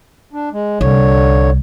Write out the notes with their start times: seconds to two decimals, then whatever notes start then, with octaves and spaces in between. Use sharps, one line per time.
0.33 D4
0.53 G#3
0.81 C2 D3 C#5